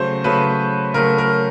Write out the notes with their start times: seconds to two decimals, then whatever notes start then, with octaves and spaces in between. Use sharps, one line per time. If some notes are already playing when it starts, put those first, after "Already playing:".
Already playing: C#3 F#3 A3 C5
0.24 C#3 F#3 A3 B4
0.94 C#3 F#3 A3 A#4
1.18 A#4